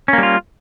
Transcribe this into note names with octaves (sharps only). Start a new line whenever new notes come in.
G3 A#3 C#4 F4